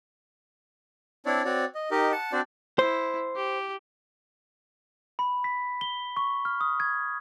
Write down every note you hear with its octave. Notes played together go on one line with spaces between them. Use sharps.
C4 D4 E4 C#5 D5
C4 F#4 C#5 D5
D#5
D#4 G4 A#4 D#5
F#5 A5
C4 D4 F#4 C5 D5
E4 C5
G4
B5
B6
G7
C#6
F6
D#6
G#6